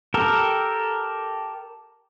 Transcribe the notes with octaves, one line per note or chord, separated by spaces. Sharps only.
G4 A4 A#4